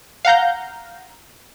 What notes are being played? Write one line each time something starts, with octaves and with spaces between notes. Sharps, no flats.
F5 F#5 A#5 G6